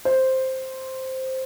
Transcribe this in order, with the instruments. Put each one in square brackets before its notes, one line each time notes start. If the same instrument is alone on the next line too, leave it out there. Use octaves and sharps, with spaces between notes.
[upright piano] C5